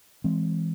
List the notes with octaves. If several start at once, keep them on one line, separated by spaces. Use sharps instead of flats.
E3 G#3 C4